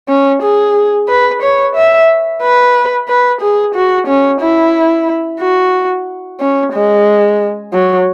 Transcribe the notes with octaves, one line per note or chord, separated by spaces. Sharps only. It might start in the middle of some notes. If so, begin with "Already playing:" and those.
C#4
G#4
B4
C#5
E5
B4
B4
G#4
F#4
C#4
E4
F#4
C#4
G#3
F#3